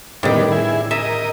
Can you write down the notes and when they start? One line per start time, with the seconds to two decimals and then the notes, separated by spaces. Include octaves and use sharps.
0.23 A2 D#3 G3 B3 D4
0.52 E4 G#4
0.91 A#4 D#5 E5